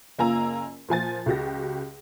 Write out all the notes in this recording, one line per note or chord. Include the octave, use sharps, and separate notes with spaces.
F#1 A#3 F4 G#5 A#5 E6
A#2 F3 G#5 A6
C#2 F#4 G4 A#6